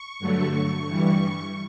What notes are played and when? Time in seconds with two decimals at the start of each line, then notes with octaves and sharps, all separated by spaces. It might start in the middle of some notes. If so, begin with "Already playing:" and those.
Already playing: C#6
0.19 G2 D3 F#3 A3
0.53 C#6
0.85 G2 E3 G3